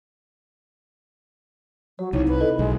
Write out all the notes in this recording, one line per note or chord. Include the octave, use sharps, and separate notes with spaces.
F#3 C#5
C2 D#4 E4 C#5
B4
A4 D#5
B1 G#3